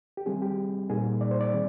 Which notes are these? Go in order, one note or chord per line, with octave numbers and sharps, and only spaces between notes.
G4
D#3 G3 C4 G#4
G4
A#2 G3 A#3 D#4 G#4
D5
C5
D5
D#3 G3 C4